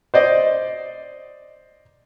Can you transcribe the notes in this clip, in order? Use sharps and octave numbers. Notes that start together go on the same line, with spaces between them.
C5 D5 D#5